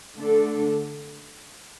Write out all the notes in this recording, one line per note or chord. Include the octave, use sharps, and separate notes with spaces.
D3 A3 D4 A4